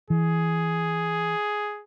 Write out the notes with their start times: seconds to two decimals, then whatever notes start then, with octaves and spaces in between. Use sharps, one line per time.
0.10 E3 G#4